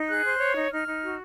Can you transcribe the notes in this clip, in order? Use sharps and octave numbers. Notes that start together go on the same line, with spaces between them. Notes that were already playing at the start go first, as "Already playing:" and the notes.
Already playing: D#4
G#4 F#6
C5
C#5
D#4
D#4 F6
D#4
F#4